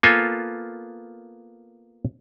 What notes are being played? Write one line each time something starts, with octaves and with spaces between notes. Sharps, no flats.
A#3 B3 F4 A4 G#5